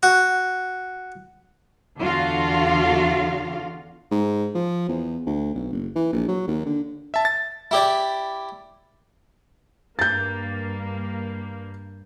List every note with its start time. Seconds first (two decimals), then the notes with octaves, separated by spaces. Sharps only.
0.03 F#4
2.00 E2 D3 D4 F4 F#4 F5
4.11 G#2
4.55 F3
4.89 E2
5.26 D2
5.54 B1
5.72 F#1
5.95 E3
6.13 A#1
6.28 F#3
6.47 D#2
6.66 D3
7.14 E5 A5
7.25 A6
7.71 E4 G4 D5
9.99 G2 A#3 G6 A6